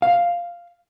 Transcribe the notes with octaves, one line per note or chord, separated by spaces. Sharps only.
F5